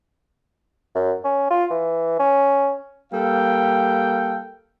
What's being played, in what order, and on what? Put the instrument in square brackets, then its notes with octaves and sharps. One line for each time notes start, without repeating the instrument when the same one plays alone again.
[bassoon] F#2
C#4
F4
E3
C#4
[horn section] G3 A#3 A4 F5 G5